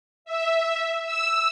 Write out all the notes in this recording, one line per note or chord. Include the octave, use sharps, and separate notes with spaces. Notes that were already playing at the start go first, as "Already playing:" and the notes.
E5
E6